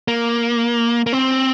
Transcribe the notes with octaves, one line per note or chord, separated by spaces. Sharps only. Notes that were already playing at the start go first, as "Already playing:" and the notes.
A#3
A#3
C4